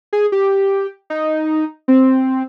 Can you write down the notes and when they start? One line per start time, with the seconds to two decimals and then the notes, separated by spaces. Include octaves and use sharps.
0.13 G#4
0.32 G4
1.10 D#4
1.88 C4